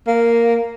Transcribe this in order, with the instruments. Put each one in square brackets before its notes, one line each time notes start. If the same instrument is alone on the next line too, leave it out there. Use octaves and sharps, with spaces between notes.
[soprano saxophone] A#3